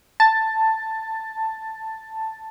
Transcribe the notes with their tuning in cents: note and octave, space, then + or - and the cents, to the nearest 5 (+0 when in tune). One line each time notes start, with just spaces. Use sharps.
A5 +5